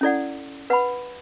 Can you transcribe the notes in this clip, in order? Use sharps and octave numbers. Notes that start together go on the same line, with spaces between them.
C#4 E4 A4 D5 F#5
B4 F#5 B5